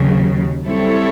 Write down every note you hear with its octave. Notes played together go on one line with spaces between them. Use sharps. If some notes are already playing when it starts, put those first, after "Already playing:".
Already playing: D#2 C#3 F#3
G3 C4 E4 A4 C#5